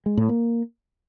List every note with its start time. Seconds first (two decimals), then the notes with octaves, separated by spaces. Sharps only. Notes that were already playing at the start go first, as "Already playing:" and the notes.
0.06 G#3
0.17 A2
0.29 A#3